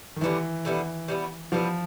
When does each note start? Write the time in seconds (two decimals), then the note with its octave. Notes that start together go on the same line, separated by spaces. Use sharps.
0.16 D#3
0.21 D3 E3 G3 B3 E4
0.65 D3 G3 B3 E4
1.08 G3 B3 E4
1.52 F3 G3 B3 E4